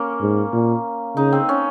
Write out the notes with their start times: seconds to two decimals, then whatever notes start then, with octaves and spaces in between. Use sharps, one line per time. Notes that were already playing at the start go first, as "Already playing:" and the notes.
Already playing: A#3 C#4
0.21 G#2
0.53 A#2
1.16 C#3 D#4
1.32 C4
1.49 C#4